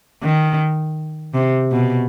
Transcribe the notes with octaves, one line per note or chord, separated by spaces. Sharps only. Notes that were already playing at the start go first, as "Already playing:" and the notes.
D#3
C3
B2